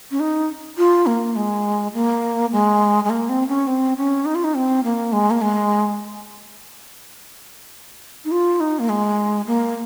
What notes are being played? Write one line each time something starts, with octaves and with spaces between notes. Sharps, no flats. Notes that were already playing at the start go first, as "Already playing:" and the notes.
C#4
D#4
F4
A#3
G#3
A#3
G#3
G#3
A#3
C4
C#4
C4
C#4
D#4
F4
D#4
C4
A#3
G#3
A#3
G#3
D#4
F4
D#4
A#3
G#3
A#3